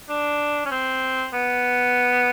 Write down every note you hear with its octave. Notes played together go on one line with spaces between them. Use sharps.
D4
C#4
C4
B3